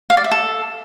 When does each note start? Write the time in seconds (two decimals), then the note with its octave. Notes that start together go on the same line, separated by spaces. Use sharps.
0.10 F5
0.17 D5
0.24 E5
0.31 A4